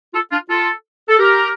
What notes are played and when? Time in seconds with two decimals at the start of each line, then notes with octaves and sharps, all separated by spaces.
0.14 F4 A4
0.32 D4 F4
0.49 F4 A4
1.09 A4
1.19 G4 A#4